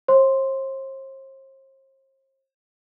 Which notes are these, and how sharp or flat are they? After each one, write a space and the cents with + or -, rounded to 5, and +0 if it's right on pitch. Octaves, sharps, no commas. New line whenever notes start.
C5 +40 C6 +0